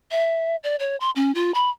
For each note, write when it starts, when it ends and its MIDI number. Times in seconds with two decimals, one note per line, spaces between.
0.11 0.56 76
0.64 0.76 74
0.80 0.96 73
1.00 1.10 84
1.16 1.34 61
1.35 1.51 65
1.54 1.69 83